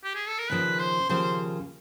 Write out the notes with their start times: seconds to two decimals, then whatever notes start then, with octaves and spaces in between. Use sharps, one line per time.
0.04 G4
0.15 G#4
0.27 A4
0.38 A#4
0.50 D#2 C#3 F3 B4
0.79 C5
1.09 D#2 C#3 F3 C5